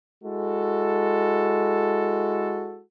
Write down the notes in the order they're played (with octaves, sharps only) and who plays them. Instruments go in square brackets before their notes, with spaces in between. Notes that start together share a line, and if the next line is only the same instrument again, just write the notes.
[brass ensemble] G#3 E4 F#4 A4